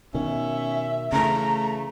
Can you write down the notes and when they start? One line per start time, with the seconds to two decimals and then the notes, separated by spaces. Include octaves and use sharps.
0.14 B2 D#3 C#4 E5
1.12 C#3 E3 A3 A#5